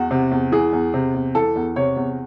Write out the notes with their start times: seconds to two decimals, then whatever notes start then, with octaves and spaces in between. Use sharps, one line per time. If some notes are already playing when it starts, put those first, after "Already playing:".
Already playing: E2 F#4
0.11 C3
0.31 E2
0.52 E3 G#4
0.73 E2
0.94 C3
1.14 E2
1.35 E3 A4
1.56 E2
1.76 C3 C#5
1.97 E2